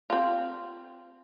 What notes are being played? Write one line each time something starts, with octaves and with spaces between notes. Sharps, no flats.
C4 F4